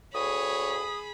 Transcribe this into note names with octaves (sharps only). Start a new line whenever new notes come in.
D2 G#4 C#5 B5 D#6